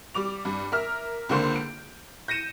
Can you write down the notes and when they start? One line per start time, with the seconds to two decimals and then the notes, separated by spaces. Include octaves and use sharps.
0.14 G3 D6 F7
0.45 G2
0.72 A#4 E5 F6
1.29 C#2 D3 A#3 C5 C6 G6
1.56 D7
2.28 G6 A#6 C#7 D#7 E7